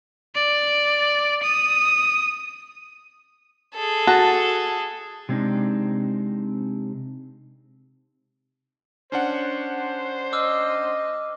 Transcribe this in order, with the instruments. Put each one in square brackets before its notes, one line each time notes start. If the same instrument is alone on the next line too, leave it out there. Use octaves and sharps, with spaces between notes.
[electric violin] D5
D#6
[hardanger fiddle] G#4 A4
[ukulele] F#4 [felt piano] A5
[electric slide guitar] C3 G#3 C4 D4 D#4
[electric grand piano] C#4 D4 F#5 [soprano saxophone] C5
[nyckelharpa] D#5 [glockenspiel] D6 E6 F6